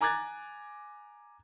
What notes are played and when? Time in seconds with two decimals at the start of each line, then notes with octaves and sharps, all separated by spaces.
0.01 G#5 A#5 D6 F#6 G#6 A6